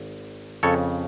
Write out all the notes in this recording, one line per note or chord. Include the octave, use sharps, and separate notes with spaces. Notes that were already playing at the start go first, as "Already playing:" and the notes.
Already playing: G#1
F2 C#3 A4 C#5